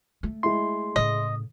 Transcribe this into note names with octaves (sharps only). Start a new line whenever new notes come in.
A3
G#3 E4 C6
A2 C#3 D#5